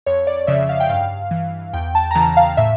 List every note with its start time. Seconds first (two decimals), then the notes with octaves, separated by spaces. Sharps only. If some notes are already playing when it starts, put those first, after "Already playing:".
0.06 F2 C#5
0.27 D5
0.47 C#3 F3 E5
0.69 F5
0.80 G5
0.90 G2 F5
1.31 E3
1.73 E2 G5
1.95 A5
2.11 A#5
2.15 C#3 E3 A5
2.37 F5
2.57 A2 E5